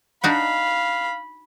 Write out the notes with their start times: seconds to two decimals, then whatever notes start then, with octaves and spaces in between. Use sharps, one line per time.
0.24 D4 D#4 F#4 F5 B5